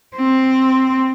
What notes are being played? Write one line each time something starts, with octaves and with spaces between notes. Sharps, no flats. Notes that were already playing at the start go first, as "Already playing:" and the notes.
C4